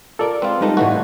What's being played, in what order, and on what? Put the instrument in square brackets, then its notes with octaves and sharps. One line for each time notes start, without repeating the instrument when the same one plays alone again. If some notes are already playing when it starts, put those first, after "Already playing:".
[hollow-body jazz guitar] F4 A#4 [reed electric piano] A4 D5
[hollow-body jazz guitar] G#3 [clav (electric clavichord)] C4 F4 [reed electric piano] B4
[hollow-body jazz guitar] G3 D#4 A4 [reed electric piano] G#3 B4
[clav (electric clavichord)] G1 E3 F#4 [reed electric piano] A2 A3